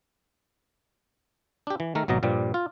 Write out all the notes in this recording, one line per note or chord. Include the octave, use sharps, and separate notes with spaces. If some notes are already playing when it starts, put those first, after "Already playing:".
D4 G4
E3
D#3 A3 A#4
G#1 B2 F#3 D#5 A#5
G2 A#2 F3 G3
F4